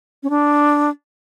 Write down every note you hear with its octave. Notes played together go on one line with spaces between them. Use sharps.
C#4
D4